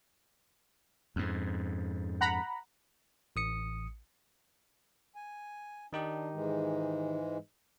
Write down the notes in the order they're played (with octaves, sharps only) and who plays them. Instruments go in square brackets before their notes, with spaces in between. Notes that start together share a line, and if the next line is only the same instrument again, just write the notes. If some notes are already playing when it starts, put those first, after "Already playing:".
[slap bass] F2 G#2
[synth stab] F#5 A#5 B5
[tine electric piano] A1 D#6 C#7
[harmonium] G#5
[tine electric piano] D#3 D#4 G4 [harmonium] D4
[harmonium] G#2 E3 G#3